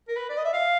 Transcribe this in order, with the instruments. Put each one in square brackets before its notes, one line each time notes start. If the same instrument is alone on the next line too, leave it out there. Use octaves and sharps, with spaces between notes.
[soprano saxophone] A#4
B4
D5
D#5
E5
F5